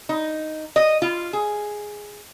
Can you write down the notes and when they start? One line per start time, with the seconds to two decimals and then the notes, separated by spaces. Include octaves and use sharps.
0.09 D#4
0.76 D#5
1.02 F4
1.33 G#4